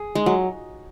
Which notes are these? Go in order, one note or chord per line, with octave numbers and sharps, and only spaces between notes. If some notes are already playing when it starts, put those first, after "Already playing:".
Already playing: G#4
G#3 D#4
F#3